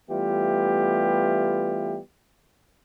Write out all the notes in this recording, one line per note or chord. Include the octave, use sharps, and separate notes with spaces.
E3 G3 A3 B3 F4 G4